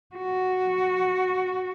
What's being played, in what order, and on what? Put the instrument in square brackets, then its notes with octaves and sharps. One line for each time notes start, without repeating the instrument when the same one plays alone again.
[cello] F#4